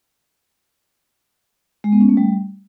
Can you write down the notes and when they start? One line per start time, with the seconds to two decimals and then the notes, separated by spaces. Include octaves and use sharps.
1.84 G#3
1.92 B3
2.01 C#4
2.09 A3
2.17 G3